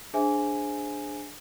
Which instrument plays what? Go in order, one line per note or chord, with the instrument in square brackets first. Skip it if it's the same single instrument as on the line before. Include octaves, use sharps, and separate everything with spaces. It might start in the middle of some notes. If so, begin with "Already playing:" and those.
[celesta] D4 G#4 C5 E5 G#5